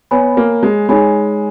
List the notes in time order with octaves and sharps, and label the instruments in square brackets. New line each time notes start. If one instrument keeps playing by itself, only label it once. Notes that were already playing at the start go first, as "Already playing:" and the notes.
[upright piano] B3 [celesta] C#5 G#5 B5
[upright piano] A#3
G#3
[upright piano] G#3 [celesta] D#4 G#4 C#5 G#5 B5